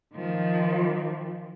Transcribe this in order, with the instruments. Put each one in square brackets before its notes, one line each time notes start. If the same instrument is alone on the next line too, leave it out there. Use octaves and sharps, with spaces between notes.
[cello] D#3 F3